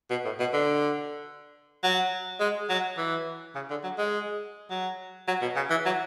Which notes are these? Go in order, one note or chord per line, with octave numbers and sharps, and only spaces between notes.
B2
A2
B2
D3
F#3
G#3
F#3
E3
C#3
D3
F#3
G#3
F#3
F#3
B2
C#3
E3
F#3